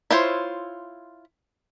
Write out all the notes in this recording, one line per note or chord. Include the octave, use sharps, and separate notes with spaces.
E4 F4 C5 C#5